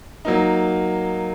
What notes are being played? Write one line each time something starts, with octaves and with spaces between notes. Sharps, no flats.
F#3 A#3 D#4